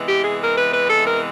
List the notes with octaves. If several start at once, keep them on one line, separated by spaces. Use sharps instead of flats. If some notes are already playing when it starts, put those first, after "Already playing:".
Already playing: C3 E3 G#3 B3
G4
G#4
A#4
B4
B4
A4
A#4